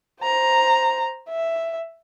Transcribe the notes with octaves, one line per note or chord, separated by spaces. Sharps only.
C5 A#5
E5